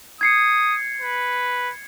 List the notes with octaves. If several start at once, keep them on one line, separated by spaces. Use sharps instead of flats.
D#6 G#6 C7 C#7
B4